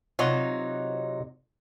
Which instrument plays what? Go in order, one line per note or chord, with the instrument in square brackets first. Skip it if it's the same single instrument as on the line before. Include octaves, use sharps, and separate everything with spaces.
[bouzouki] C3 F#3 D#4 [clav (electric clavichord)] F4 C#5 D#5